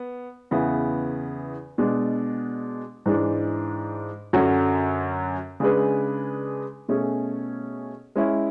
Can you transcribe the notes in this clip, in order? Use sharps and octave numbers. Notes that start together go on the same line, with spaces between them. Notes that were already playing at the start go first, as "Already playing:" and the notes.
Already playing: B3
E2 C#3 E3 B3 E4
B2 G#3 D4
G#2 E3 G#3 D4
F#2 D3 F#3 C#4 F#4
C#3 G#3 D4 G#4 B4
B2 A3 C#4 G#4
G#3 C#4 E4